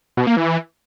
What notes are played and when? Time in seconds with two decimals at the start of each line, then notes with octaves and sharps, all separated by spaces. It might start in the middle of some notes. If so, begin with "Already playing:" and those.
0.17 B2
0.27 A#3
0.37 E3